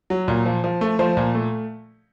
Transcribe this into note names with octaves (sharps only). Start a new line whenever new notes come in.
F#3
A#2
F3
F3
A3
F3 C5
A#2
A3